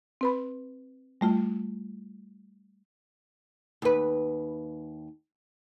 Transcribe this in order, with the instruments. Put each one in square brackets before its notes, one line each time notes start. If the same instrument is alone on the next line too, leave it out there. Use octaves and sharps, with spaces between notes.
[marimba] C4 B4 B5
G3 A3 F4
[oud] D#2 B4